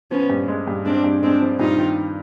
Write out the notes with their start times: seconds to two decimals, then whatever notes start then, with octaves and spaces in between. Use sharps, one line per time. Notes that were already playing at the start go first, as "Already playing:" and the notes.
0.11 F3 B3 C#4
0.30 G2
0.48 G#3
0.68 G2
0.85 G#3 C4 D4
1.04 G2
1.23 G#3 C4 D4
1.42 F3
1.60 G2 D#4 F4
1.78 D#3